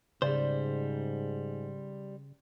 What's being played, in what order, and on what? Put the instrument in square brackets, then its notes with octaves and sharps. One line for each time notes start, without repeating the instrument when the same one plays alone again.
[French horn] G#2 [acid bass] C#3 [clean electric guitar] G3 C5 [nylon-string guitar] D5